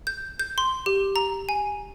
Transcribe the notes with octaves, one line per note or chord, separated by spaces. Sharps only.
G6
G6
C6
G4
A#5
G#5